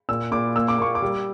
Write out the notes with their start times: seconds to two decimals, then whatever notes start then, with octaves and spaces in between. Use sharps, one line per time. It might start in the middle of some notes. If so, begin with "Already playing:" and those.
0.09 A#2 E6
0.32 A#2 D6
0.56 A#3 E6
0.68 D6
0.78 A#3 C#6
0.95 D6
1.02 G3